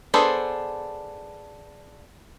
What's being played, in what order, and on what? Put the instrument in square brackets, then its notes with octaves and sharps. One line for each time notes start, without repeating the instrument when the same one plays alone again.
[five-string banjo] B3 D4 G#4 A4 C5